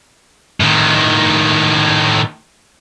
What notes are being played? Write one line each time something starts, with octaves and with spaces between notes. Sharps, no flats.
A2 D#3